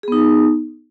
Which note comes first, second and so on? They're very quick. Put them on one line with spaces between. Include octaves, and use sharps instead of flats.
G#4 B3 D#4